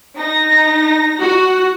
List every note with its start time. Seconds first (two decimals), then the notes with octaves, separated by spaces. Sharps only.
0.17 D#4 A#6
1.20 F#4